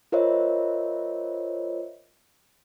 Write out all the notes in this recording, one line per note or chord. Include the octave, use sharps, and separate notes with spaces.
F4 A#4 C5 C#5 D#5 E5